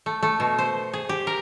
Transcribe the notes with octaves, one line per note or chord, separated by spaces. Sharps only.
A3
A3
B2
C5
G#4
G4
A#4